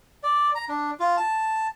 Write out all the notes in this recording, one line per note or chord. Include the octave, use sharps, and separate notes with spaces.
D5
A#5
D4
F4
A5